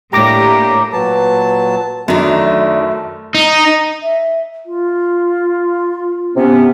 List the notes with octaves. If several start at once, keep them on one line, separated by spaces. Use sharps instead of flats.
A2 A#3 D4 G4 A#5 D6 A#6
A#2 F#3 B4 A5
F#2 D#3 A3 D4
D#4
E5
F4
C3 B3 C#4